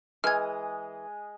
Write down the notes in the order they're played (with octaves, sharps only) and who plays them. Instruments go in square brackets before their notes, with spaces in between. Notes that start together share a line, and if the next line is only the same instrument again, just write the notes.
[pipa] E3 [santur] G#3 D#6 [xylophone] F6 G#6